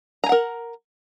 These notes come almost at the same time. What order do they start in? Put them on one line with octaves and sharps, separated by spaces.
A#5 G#5 F#5 A#4